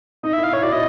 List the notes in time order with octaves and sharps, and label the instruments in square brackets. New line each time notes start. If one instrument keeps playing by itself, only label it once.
[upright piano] D#4 [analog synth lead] D#5
[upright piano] E4 [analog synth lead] E5
[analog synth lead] F5
[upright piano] E4 [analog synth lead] C#5
[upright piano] F#4 [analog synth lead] D5
[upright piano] E4 [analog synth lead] D#5